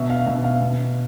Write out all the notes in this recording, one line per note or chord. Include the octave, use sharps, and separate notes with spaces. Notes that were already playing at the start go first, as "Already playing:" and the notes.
Already playing: B2 E5
F5
B2 E5
F5
B2